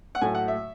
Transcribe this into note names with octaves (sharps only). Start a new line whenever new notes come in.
F#5
A2 F#3 A3 G#5
F#5
E5